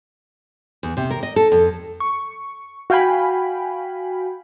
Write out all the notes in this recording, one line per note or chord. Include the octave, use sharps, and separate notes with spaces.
E2
C3
A#4
D#5
A4
F2
C#6
F#4 F5 G5 G#5 B5